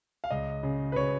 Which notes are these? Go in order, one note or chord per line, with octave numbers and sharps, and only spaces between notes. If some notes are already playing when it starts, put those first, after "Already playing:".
F5
C#2 D#5
C#3
B4
C#3 C#5